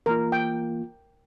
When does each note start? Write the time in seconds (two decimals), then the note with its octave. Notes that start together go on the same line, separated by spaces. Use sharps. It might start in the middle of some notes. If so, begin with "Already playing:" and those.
0.06 E3 A#3 F4 A#4
0.32 G5